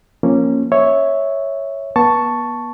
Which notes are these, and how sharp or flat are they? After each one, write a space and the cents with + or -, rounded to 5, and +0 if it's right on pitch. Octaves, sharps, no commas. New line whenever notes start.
F3 +0 A#3 +0 C#4 -15
C#5 +0 E5 -10
B3 -40 A5 +0 C#6 +0